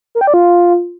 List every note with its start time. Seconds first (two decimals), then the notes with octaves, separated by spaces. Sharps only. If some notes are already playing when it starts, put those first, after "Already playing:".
0.15 A#4
0.21 G5
0.27 D5
0.34 F4